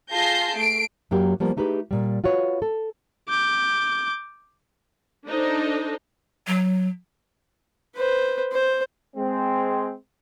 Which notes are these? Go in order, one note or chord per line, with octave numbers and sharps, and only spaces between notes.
F4 G#4 A5 G6 A#6 C7
A3 C7 D7
F#2 F#3 A#3 G4
F3 G3 A#3 B3
A3 D#4 G4 G#4 B4
A#2 G3
F4 F#4 B4 C#5
A4
D6 G6
D4 D#4 A4 C5
F#3
B4 C5
C5
G#3 C4